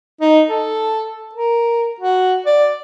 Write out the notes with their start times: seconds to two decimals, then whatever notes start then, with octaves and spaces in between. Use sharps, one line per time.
0.21 D#4
0.48 A4
1.35 A#4
2.01 F#4
2.46 D5